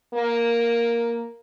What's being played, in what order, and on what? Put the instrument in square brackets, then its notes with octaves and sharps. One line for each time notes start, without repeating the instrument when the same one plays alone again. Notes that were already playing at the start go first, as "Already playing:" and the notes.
[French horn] A#3